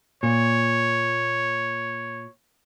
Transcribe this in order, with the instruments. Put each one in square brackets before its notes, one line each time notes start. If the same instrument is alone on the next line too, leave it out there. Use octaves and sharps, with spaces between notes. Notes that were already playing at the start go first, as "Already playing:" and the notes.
[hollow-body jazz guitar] A#2 [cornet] C#5